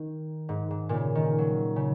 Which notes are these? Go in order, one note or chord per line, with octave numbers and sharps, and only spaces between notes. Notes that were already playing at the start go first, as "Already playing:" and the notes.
Already playing: D#3
G#2
G#2
A#2 C#3
D#3
F#3
C#3